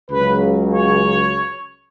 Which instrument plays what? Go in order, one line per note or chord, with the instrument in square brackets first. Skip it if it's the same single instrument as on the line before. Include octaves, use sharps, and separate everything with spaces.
[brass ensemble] C#2 C#3 F#3 B4
C#5